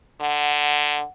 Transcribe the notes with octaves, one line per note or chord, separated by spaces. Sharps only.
D3 F#5